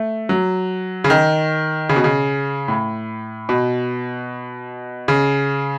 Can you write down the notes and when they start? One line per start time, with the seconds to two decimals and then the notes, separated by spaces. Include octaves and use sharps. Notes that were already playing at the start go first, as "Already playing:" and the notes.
Already playing: A3
0.29 F#3
1.04 C#3
1.10 D#3
1.89 C#3
1.96 B2
2.04 C#3
2.68 A2
3.49 B2
5.08 C#3